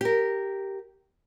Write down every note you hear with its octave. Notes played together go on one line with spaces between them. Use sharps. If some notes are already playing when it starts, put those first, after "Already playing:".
G4 A#4